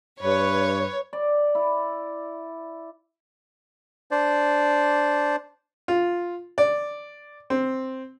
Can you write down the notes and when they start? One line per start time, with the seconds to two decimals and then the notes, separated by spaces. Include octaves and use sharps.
0.22 G2 B4 C#5
1.13 D5
1.55 E4
4.11 D4 C5 D5
5.88 F4
6.58 D5
7.50 C4